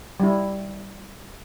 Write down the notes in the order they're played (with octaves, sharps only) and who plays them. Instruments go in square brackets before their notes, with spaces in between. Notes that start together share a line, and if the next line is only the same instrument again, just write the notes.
[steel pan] G3 E4